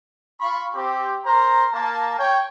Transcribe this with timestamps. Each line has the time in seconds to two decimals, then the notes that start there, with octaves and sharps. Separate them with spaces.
0.40 F4 F5 B5 C#6
0.75 C4 G4
1.25 A#4 C5 A#5
1.73 A#3 A5
2.18 C#5 G5